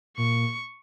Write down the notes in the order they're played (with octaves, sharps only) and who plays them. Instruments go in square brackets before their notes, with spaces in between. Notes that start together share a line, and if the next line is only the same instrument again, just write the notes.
[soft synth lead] A#2 [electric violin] C#6